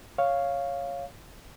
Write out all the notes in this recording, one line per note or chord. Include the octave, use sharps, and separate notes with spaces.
C#5 F5